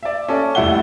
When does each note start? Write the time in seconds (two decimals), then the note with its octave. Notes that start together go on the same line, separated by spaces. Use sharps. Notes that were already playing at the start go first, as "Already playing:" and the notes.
0.03 D5 E5
0.28 C#4 A4 D5
0.55 F1 G3 E4 E5 F#5 G7